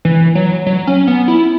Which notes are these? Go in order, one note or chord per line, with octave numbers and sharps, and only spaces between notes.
E3
F#3
F#3
C#4
B3
E4